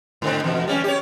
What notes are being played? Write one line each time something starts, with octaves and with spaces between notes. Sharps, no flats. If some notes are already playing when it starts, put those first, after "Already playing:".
G#2 D3 C4
E2 B2
G3 C#4
G4 C#5